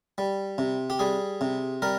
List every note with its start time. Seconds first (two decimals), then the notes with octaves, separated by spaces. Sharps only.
0.18 G3
0.58 C3
0.90 G4
0.99 G3 G#4
1.41 C3
1.82 G3 A#4